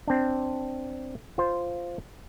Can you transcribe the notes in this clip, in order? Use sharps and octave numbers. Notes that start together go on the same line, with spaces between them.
C4 D4
F4 C5